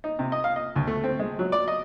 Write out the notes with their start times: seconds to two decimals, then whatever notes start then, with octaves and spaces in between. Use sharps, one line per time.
0.04 D#4
0.19 C3
0.32 D#5
0.44 F5
0.56 D#5
0.76 D2
0.87 A3
1.04 C4
1.19 G#3
1.39 F#3
1.52 D5
1.68 D#5